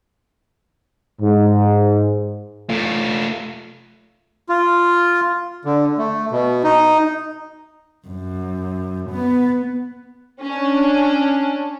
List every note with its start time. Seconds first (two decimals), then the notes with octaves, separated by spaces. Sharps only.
1.20 G#2
2.70 A3 F4
4.49 F4
5.65 D3
5.98 A3
6.31 B2
6.64 D#4
8.07 F#2
9.10 B3
10.43 C#4 D4